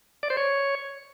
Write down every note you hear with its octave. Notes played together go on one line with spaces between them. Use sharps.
D5
C5
C#5